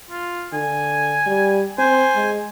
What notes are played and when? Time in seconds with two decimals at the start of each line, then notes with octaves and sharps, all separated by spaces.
0.10 F4
0.53 D3 G#5
1.27 G3
1.78 C4 C5 G#5
2.16 G#3